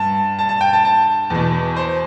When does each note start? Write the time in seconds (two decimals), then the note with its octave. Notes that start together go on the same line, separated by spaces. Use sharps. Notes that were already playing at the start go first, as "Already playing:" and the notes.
Already playing: G2 A5
0.39 A5
0.49 A5
0.61 G5
0.73 A5
0.85 A5
1.30 E2 B2
1.76 C5